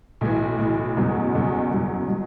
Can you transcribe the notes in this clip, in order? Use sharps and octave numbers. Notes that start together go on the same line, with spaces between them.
B1 A2 E3
B1 A2 E3
F#1 E2 B2 F#3
F#1 E2 B2 F#3
F#1 E2 B2 F#3
B2 F#3